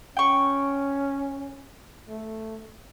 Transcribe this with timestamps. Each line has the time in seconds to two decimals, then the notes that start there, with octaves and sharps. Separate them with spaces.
0.17 C#4 G5 C#6
2.09 A3